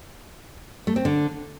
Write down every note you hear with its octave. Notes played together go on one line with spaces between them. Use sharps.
A3
C4
D3